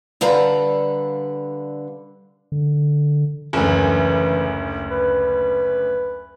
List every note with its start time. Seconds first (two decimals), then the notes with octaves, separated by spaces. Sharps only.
0.21 D3 G3 A4 B4 F5 A#5
2.52 D3
3.53 F#1 D2 E3
4.91 B4